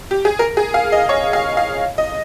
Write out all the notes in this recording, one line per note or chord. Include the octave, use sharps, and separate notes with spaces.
G4
G#4
A#4
G#4
F5
D#5
C#5
F5
F5
D#5